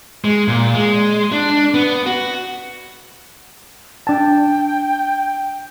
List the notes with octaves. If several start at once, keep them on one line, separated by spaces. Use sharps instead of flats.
G#3
A#2
G#3
D4
B3
F#4
D4 G5 A5